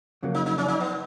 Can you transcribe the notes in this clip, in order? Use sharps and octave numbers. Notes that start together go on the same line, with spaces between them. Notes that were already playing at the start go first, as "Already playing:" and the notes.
F2 C#3 F#3 A#3
D#4
D#4
C#4
D#4
B3